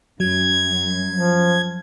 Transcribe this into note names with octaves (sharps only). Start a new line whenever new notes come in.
F#2 F#3 G#6
F3